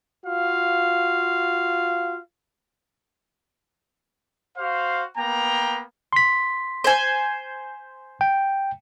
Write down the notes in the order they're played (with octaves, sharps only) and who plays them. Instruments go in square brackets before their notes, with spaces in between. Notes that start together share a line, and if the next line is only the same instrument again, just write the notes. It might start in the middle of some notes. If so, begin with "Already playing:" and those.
[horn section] F4 F#4 F5
[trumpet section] F#4 C5 F5
A#3 B3 G5 A#5
[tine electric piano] C6 B6
[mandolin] C5 G#5
[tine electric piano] G5